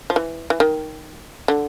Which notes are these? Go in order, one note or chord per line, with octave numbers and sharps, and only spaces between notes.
F3
E3
E3
D#3
D3